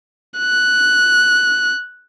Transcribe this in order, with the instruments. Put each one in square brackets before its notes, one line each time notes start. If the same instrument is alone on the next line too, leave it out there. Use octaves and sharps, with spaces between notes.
[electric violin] F#6